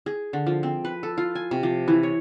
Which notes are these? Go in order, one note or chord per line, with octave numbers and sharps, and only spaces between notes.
G#4
D3
F3
C4
B4
A4
F4
G#5
C3
F3
E3
C#5